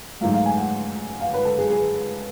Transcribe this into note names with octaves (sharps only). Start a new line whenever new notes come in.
G#2 F#3 A3 F5
F5
G#5
F#5
F5
B4
A4
G#4
G#4